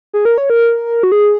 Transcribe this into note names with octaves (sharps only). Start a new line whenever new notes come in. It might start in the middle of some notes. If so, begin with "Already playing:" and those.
G#4
A#4
C#5
A#4
F#4
G#4